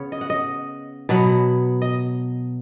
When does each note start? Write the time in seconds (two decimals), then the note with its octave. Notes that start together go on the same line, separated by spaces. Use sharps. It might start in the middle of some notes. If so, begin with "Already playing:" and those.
Already playing: C#3 B3 C#5
0.12 D#5
0.21 F#5
0.30 D#5
1.09 B2 F#3 B3 F#5
1.82 D#5